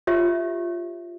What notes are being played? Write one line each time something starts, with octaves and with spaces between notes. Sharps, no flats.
F4 G4 C#5 E5